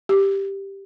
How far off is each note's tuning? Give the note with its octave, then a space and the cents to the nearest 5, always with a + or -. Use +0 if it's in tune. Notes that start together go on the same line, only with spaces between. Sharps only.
G4 +0